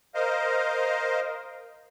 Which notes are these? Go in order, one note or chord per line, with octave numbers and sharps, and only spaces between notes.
A#4 C5 D#5 F5